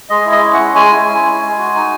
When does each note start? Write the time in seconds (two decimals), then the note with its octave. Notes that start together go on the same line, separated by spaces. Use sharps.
0.09 G#3 D#5
0.26 E4
0.32 D#5
0.43 C#4
0.53 F#5
0.59 G#3
0.75 G#3 G#5
0.92 E4
1.08 C#4
1.25 G#3
1.41 G#3
1.58 F#4
1.75 D#4